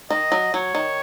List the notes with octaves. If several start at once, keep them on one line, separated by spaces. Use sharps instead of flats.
D#3 D#5
F#3
F#3 C#5
D#3